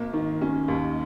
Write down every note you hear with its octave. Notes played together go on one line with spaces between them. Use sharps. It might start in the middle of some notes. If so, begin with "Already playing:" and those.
Already playing: G#1 A#3
D#3
C#4
D#2